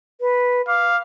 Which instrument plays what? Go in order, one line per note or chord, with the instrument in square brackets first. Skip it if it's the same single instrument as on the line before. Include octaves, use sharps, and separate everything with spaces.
[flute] B4
[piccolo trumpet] F5 [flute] D6